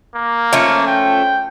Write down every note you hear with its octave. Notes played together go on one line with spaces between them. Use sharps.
A#3
F3 A3 C#4
G5